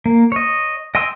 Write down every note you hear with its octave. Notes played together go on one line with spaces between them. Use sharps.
A#3
C#5 D#5
D#5 G5 G#5 C6 E6